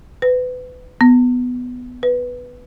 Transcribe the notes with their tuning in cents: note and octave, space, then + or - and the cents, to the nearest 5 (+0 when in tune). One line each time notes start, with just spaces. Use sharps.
B4 +25
B3 +10
B4 +0